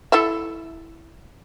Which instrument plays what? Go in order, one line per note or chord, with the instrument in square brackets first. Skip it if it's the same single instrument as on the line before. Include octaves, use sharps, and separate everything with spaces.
[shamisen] E4 A4 E5